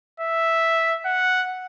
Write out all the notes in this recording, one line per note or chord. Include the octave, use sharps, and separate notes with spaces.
E5
F#5